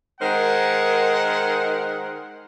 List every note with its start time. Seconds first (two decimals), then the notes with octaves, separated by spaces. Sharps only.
0.20 D#3 G#3 A#4 C5 F#5